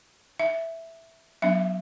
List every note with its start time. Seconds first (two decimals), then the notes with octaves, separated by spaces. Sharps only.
0.39 E5
1.42 F#3 B3 D4 E5